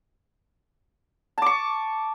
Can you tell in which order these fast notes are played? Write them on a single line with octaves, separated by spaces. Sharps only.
A5 D6 C#6